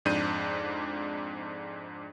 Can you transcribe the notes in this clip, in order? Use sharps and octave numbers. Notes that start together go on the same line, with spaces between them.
F2 G#2 D4 G6 D#7